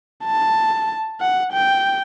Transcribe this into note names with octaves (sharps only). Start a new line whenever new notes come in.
A5
F#5
G5